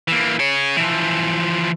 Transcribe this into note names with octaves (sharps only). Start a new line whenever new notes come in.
E3 A#3
G#4 C#5
E3 F3